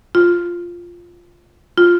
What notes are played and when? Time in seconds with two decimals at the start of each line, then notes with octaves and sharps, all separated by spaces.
0.15 F4
1.78 F4